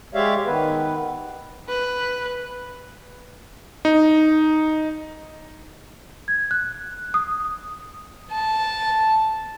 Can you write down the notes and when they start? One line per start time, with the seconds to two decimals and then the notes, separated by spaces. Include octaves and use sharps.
0.14 G#3 G4 C#5 D5 E5 F5
0.46 D#3 B3 B4
1.69 B4
3.85 D#4
6.28 G#6
6.51 F#6
7.14 D#6
8.32 A5